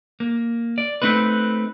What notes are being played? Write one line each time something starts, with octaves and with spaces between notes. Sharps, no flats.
A#3
D5
A3 C4 D#4 B4